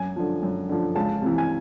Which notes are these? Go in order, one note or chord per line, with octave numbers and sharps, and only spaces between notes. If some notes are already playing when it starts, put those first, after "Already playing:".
Already playing: F#2 G#5
D3 F3
F#2
D3 F3
C#2 A5
C3 E3
G#5